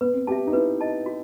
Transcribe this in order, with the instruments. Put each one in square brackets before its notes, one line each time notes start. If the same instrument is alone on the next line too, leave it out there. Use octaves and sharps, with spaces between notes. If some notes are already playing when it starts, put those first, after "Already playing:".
[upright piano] B3 [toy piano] B4
[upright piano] C4
[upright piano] G4 [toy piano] A5
[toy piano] E5
[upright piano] D#4
[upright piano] E4 [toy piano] B4
[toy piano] D#5 A5
F#4